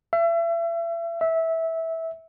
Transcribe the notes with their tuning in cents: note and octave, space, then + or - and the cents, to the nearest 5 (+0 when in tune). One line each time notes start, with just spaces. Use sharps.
E5 +35
E5 -15